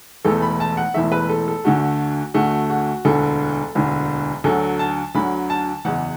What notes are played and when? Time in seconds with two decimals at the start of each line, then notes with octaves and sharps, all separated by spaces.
0.25 E1 E2 E3 A3 A4
0.42 B5
0.60 A5
0.77 F#5
0.94 E1 E2 E3 A3 E5
1.12 B4
1.29 A4
1.48 A4
1.64 D2 D3 A3 F#4
2.34 D2 D3 A3 F#4
2.70 F#4
3.05 E1 D2 D3 A4
3.75 E1 D2 D3
4.44 D2 D3 F#3 A4
4.79 A5
5.15 D2 D3 F#3 B5
5.50 A5
5.85 F#1 E2 E3 F#5